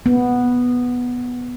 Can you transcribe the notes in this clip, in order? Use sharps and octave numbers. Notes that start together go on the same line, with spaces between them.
B3